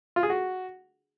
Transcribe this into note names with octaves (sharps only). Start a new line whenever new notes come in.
F4
G#4
F#4